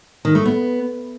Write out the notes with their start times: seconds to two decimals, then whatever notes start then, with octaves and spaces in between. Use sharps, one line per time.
0.25 D#3
0.35 A3
0.45 B3